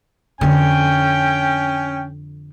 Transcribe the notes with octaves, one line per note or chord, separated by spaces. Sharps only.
F2 D3 C#4 G5